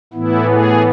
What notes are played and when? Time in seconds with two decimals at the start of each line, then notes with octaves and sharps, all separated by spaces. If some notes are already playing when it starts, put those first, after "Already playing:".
0.13 A2 E3 B3 E4
0.50 G#4